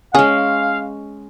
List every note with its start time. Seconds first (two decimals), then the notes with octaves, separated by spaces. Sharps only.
0.15 G#3 C#4 G#4 F5